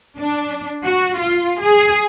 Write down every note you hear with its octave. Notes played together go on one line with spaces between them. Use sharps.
D4
F#4
F4
G#4